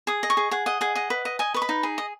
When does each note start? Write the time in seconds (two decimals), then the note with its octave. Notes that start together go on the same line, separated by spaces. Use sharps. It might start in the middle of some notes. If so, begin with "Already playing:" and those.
0.07 G#4 D#6
0.23 D#5
0.30 C#6
0.37 G#4
0.51 G#4 F#5
0.66 D#5 F#5
0.81 G#4 F#5
0.95 D#5 F#5
1.10 B4
1.25 D#5
1.39 D#5 G#5
1.54 B4 C#6
1.62 B5
1.69 D#4
1.83 G#4
1.98 D#5